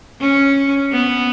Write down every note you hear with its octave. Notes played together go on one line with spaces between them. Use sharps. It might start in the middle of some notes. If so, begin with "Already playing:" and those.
C#4
B3